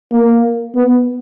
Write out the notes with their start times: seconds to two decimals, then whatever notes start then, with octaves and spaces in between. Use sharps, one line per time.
0.12 A#3
0.75 B3